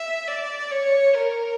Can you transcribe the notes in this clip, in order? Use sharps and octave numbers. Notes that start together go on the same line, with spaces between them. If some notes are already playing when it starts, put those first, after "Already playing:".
Already playing: E5
D5
C#5
A#4